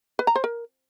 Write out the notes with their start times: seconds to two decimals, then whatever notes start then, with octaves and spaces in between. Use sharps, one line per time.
0.19 B4
0.27 A#5
0.36 C5
0.44 A#4